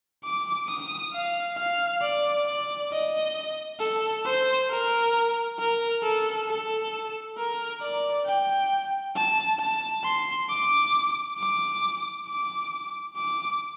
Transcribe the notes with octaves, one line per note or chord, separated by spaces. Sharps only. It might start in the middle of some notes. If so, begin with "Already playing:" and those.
D6
D#6
F5
F5
D5
D5
D#5
A4
C5
A#4
A#4
A4
A4
A#4
D5
G5
A5
A5
C6
D6
D6
D6
D6